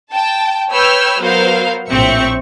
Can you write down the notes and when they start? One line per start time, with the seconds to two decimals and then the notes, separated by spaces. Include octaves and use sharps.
0.13 G5 A5
0.72 B4 C#5 G5 E6 F6
1.21 F#3 B3 A#4 C5 F5
1.89 A#1 A2 C4 E5 C#6 C#7